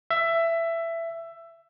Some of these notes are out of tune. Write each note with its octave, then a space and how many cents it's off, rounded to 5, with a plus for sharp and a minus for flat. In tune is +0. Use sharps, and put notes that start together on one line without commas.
E5 +15